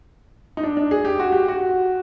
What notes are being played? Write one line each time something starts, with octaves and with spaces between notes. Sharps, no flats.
D#4
D4
D4
G#4
G4
F#4
G4
F#4